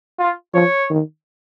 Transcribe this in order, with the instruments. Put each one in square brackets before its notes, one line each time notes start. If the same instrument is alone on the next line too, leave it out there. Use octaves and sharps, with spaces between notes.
[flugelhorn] F4
[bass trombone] F3 [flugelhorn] C#5
[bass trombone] D#3